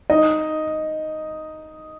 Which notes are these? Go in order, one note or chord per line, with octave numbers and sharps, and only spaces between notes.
D#4 D#5